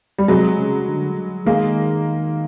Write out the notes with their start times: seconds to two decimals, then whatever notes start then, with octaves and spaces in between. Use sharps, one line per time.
0.18 G3
0.28 C3 F#3 G#3
0.59 C#3
0.87 D3
1.46 D#3 G#3 A#3